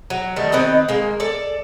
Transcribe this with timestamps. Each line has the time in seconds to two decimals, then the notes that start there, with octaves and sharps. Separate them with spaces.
0.10 F#3
0.36 D#3 G3 A3
0.52 D#3 C4 B4 D#5
0.89 G#3 A#3
1.20 A4 D5